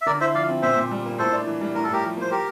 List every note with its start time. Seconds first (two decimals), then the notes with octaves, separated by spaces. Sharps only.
0.01 E5
0.06 D3 A#4 D5
0.20 E4 C5 E5
0.34 F3 D5 F5
0.48 C4
0.62 A#2 C5 E5
0.76 A#2
0.91 G3
1.05 A#3
1.18 A2 A4 C5
1.32 D4
1.46 E3
1.61 G3
1.75 A2 A#4
1.84 A4
1.88 A2 G4 A#4
2.02 F3
2.17 A#3 C5
2.31 G4 A#4